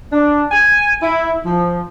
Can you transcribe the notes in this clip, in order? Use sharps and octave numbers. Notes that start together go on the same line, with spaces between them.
D4
G#5
E4
F3